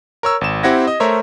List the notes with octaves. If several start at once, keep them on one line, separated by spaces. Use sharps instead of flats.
A#4 C#5 E6
G#1 E7
C4 E4 G4 F#5 G#6 A#6
D#5
A3 A#4 C5 C#5 E5